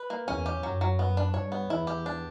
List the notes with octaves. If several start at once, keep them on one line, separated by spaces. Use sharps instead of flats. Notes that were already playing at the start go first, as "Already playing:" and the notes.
Already playing: B4
A#3
E2 C#4
G4
F#2 F#3
F#3
B3
D4
G2 C#5
B3
E2 E4
G4
D4